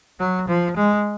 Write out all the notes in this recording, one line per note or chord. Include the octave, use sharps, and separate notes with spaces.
F#3
F3
G#3